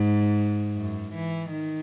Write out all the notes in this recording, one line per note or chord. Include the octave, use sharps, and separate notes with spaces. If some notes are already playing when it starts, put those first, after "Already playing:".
Already playing: G#2
F#2
E3
D#3